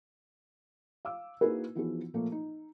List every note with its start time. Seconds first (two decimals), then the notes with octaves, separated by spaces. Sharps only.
1.05 F5 D6 E6
1.41 A#3 D#4 E4 F#4 G#4 B4
1.75 E3 F3 B3 D#4 F#4 G#4
2.14 A#2 F3 A3 A#3
2.32 D#4